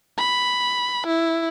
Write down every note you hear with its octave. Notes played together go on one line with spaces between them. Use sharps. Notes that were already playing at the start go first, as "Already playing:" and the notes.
B5
E4